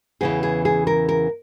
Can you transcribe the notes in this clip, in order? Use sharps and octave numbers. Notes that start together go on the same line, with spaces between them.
E2 C#3 E3 G#4
G#4
G#4
A#4
A#4